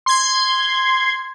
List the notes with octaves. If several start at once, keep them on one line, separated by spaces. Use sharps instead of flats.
C6 G#6